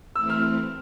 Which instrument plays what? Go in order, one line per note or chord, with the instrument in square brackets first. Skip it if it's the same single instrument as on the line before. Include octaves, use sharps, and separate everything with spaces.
[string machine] E3 A3 C4 E4 [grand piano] E6
[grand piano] F6